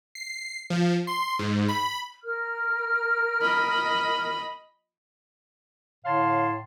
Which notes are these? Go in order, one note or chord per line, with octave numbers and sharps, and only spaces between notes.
C7
F3
C6
G#2
B5
A#4 F6
D#5 B5
A2 D3 C#5 F5 A5 C6